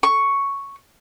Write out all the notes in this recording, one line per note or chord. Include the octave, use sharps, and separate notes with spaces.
C#6